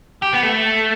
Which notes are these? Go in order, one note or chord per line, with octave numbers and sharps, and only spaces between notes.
G4
B3
A3